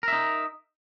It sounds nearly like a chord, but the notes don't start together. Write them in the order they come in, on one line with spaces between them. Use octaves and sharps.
A#4 E5 D#4